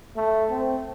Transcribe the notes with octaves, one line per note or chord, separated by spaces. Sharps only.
A3
C4